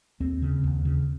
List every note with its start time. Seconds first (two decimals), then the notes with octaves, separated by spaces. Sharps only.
0.20 D#2 C4
0.42 C#3
0.64 D#2
0.85 C#3